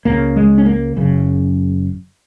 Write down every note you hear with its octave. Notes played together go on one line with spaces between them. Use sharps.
C#2 C#3 A#3
G#3
C#4
A#3
F#1 F#2 C#3